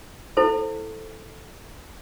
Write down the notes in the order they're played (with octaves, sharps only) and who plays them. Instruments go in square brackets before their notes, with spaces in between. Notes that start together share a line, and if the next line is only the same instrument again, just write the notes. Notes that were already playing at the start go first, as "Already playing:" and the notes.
[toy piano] E4 A4 C5